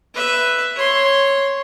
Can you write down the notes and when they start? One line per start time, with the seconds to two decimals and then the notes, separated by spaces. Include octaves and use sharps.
0.14 B4 E5
0.75 C#5 C6